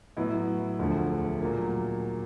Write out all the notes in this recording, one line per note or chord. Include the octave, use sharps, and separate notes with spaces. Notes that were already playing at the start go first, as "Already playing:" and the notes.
A2 F#3 B3 E4
E1 D2 D3 F3 A3
A#2 F#3 A#3